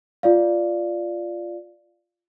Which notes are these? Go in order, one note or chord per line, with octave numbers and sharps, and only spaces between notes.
F4 D5 F5